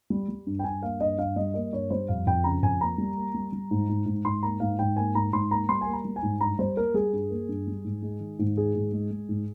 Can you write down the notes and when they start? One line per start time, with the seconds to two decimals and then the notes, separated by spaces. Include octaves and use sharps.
0.10 G3
0.29 G3
0.47 G2
0.59 G5
0.64 G2 G#5
0.82 A#3 F5
1.01 G2 D#5
1.18 G2 F5
1.36 G3 D#5
1.54 A#3 D#5
1.73 G2 C#5
1.90 G3 C5
2.08 F2 F5
2.26 F2 G5
2.44 C#3 A#5
2.62 F2 G#5
2.81 A#3 A#5
2.98 G3
3.17 A#3
3.34 G3
3.53 G3
3.71 G#2
3.89 G#2
4.06 G#2
4.25 G#2 C6
4.43 A#3 A#5
4.60 G#2 F5
4.79 G#2 G5
4.96 A#3 G#5
5.15 G#2 A#5
5.33 G#2 C6
5.50 A#3 A#5
5.69 G3 C6
5.81 A#3 G#5
5.93 A#5
6.05 G3
6.16 G#5
6.23 G#2
6.40 G2 A#5
6.59 G3 C5
6.76 A#3 A#4
6.94 G3 G#4
7.13 G2
7.30 A#3
7.49 G2
7.67 G3
7.85 G#2
8.02 G#3
8.20 D#3
8.39 G#2
8.56 D#3 G#4
8.75 G#2
8.92 G#3
9.11 G#3
9.29 G#2